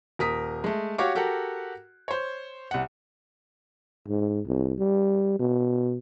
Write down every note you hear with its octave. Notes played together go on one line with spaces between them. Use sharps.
D#1 A#4 D#6 B6
G#3 A3
F#4 G4 C#5 F5 D6
F#4 G4 A4 A#4 F#5
C5 C#5
C2 F#5
G#2
C2
G3
B2